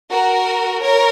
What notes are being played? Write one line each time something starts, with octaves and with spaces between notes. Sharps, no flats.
F#4 A#4
A#4 C#5